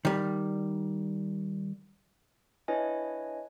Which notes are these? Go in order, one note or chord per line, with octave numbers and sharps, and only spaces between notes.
D#3 G3
D4 E4 B4 C#5 D#5 G#5